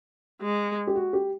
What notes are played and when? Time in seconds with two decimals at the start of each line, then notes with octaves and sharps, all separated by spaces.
0.42 G#3
0.87 G4
0.96 F#4
1.13 G4